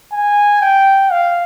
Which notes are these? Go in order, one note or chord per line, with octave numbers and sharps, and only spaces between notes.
G#5
G5
F5